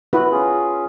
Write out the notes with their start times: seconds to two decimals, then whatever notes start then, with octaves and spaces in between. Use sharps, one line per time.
0.13 E4 F#4 B4
0.31 C#4 F4 G#4